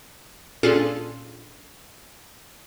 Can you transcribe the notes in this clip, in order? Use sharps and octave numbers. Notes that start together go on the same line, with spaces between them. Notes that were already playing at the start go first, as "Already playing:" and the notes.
A#2 C#4 D4 F4 G#4 A4